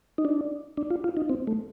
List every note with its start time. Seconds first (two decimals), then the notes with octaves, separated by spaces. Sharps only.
0.18 D#4
0.25 D4
0.77 D4
0.91 F4
1.04 F4
1.17 D#4
1.29 C4
1.47 A3